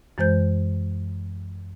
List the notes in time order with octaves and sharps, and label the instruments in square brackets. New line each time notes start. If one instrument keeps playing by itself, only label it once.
[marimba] F#2 E3 G#3 C5 G6